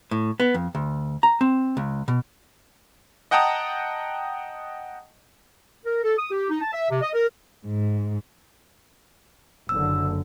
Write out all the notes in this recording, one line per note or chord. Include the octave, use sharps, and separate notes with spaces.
A2
B3
F2
D2
A#5
C4
C#2
B2
D#5 F#5 G5 A5 A#5 D#6
A#4
A4
D#6
G4
D#4
A5
E5
C3
D#5
A#4
G#2
F#1 D3 E6